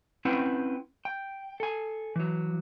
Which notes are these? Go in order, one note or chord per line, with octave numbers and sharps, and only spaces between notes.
C4 C#4 E4 B4 F#5 G5
G5
A4 G#5
E3 F#3